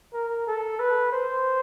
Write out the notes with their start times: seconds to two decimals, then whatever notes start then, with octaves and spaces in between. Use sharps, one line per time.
0.13 A#4
0.47 A4
0.80 B4
1.12 C5